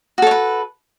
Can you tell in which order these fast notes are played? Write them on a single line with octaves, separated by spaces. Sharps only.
F#4 A4 C#5 B4